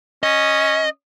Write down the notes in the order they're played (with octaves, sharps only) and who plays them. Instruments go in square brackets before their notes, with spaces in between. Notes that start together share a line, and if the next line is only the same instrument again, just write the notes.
[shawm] C#4 [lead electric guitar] D#5